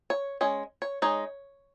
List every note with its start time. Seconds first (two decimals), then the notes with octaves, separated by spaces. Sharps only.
0.10 C#5
0.41 G#3 C#4 C#5
0.82 C#5
1.02 G#3 D#4 C#5